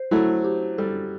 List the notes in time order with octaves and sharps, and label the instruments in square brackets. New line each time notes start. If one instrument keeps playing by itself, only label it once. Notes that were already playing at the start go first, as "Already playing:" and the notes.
Already playing: [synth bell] C5
[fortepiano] F#3 A3 [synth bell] E4
[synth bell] G4
[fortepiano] G3 [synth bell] A4